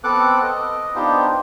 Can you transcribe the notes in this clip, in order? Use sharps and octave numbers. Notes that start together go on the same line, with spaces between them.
B3 C4 A4 F#5 D6 F#6
D#5
B3 D4 D#4 F4 G4 C5